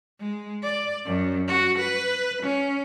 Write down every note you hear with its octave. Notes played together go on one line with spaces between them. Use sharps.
G#3
D5
F#2
F#4
B4
C#4